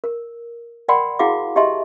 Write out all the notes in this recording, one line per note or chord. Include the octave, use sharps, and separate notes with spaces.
A#4
A#4 D5 F#5 G5 B5 C6
E4 F#4 G#4 F5 F#5 D6
G4 D#5 E5 A5 C6